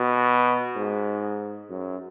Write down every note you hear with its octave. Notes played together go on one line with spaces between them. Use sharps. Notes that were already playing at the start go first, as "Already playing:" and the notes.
Already playing: B2
G#2
F#2